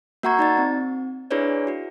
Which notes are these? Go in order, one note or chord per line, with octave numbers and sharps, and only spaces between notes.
A#3 F#4 F#5 A#5 C#6 G#6
D#4 D5 A6
C4
D4 E4 G#4 B4 C#5 D5
E4 F#4